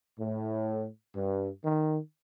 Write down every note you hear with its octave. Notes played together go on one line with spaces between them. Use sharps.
A2
G2
D#3